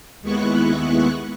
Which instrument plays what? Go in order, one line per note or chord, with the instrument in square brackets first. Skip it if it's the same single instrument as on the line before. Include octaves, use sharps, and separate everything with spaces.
[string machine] D#2 G#3 B3 E4 C#6 F#6